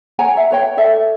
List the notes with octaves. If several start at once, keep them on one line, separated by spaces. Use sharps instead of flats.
C#5 F#5 G#5 A#5
E5
B4 C#5 G5
A4 D5 E5 A5